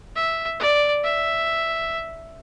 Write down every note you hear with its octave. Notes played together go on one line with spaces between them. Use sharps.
E5
D5
E5